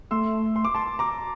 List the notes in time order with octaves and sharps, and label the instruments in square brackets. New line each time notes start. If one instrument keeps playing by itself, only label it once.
[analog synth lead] A3 [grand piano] C6 E6
[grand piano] C6
D6
A5 C6
A#5 D6